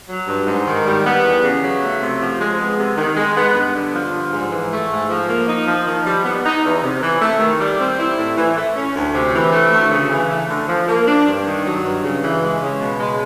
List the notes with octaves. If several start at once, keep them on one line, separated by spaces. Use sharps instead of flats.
F#3
G2
G#2
D#3
G3
B3
E2
C#3
F#3
A3
C3
F3
G#3
B3
C3
D#3
G#3
B3
G2
D3
F3
G2
G#2
E3
A3
G#2
F3
A#3
D#4
F3
D#3
G3
B3
D#4
E2
C3
E3
A3
D#3
G3
C4
E4
A2
E3
A3
C#4
D2
C3
E3
A3
D2
C#3
E3
A3
D3
F3
A#3
D4
G2
D#3
F#3
G2
C#3
E3
G#3
C#3
B2
G#3